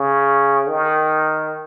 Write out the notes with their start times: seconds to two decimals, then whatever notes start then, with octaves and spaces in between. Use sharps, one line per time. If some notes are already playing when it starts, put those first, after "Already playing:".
Already playing: C#3
0.69 D#3